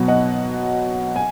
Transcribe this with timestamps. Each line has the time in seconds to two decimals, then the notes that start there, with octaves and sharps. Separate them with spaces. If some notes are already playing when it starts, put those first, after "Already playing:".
Already playing: B2 F#3 B3
0.08 D#5 F#5
1.16 G#5